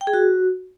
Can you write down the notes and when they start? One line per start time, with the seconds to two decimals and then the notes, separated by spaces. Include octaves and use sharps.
0.01 G5
0.07 G#4
0.13 F#4